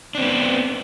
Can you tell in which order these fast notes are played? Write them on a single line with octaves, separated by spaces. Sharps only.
D4 C4 B3